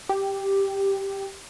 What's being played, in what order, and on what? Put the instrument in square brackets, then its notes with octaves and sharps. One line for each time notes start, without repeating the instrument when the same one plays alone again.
[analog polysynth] G4